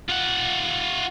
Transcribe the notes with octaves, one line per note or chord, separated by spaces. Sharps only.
F4 F#5